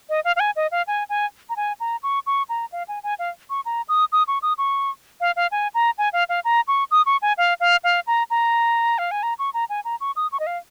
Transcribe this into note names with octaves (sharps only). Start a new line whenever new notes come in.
D#5
F5
F5
G#5
D#5
F5
G#5
G#5
A#5
G#5
A#5
C#6
C#6
A#5
F5
G#5
G#5
F5
C#6
A#5
D#6
D#6
C#6
D#6
C#6
F5
F5
G#5
A#5
G#5
F5
F5
A#5
C#6
D#6
C#6
G#5
F5
F5
F5
A#5
A#5
F5
G#5
A#5
C#6
A#5
G#5
A#5
C#6
D#6
C#6
D#5
F5